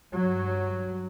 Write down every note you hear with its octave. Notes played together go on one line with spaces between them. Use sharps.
G2 F#3